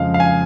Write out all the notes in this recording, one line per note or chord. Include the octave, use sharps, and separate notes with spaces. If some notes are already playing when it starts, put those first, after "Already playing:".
Already playing: F2 C#3 G#3 F5
F5
G#5